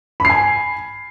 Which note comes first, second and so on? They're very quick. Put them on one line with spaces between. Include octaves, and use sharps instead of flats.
B5 C7 G#5